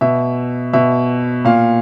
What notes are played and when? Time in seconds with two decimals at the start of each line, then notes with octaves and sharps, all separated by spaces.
0.01 B2 E5
0.73 B2 E5
1.45 A#2 F5